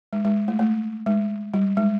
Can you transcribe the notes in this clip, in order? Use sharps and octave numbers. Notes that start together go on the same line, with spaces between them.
G#3
G#3
A3
A3
G#3
G3
G#3